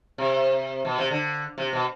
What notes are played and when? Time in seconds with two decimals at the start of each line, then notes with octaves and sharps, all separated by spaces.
0.18 C3
0.85 B2
0.98 C3
1.11 D3
1.58 C3
1.73 B2